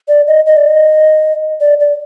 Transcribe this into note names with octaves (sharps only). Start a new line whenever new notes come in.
D5
D#5
D#5
D5
D#5
D5
D5